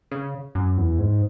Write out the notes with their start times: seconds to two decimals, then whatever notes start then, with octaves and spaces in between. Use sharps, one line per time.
0.11 C#3
0.55 F#2
0.78 E2
0.99 G#2